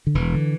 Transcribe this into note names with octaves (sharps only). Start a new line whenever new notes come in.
D3
E1 E3
D3